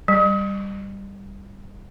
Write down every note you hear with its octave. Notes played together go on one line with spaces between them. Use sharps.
G3